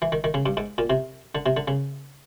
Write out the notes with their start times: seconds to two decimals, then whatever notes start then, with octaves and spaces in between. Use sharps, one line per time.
0.02 E3
0.12 D#3
0.24 D#3
0.34 C#3
0.46 G2
0.57 G#2
0.78 A#2
0.90 C3
1.35 D3
1.46 C3
1.57 D3
1.68 C#3